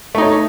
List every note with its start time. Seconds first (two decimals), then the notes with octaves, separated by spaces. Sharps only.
0.15 A3
0.18 D#4
0.22 C#5